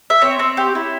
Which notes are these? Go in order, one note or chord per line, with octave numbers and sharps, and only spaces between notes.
E5
C4 C#5
C4
G4
E4